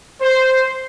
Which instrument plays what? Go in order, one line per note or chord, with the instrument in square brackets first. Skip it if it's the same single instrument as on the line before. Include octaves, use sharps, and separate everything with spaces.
[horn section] C5